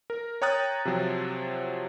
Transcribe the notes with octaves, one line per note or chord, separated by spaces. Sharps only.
A#4
C#5 G5 A#5 D#6 F#6 A6
C3 F3 F#3